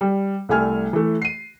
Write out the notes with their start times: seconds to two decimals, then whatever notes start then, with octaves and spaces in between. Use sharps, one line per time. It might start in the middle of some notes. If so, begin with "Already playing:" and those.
0.01 G3
0.49 C2 G3 A3 G#5 F6
0.93 E3 A3
1.22 C7 D#7